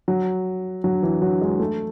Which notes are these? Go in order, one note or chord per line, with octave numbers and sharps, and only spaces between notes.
F#3
F#3
E3
F#3
G#3
A3